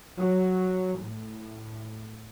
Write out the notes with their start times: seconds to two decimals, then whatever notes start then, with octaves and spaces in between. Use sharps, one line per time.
0.18 F#3
1.00 A2